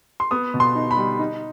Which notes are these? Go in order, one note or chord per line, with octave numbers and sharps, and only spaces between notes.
C6
B3 D#6
B2
C6
D#4
B5
G3
D#4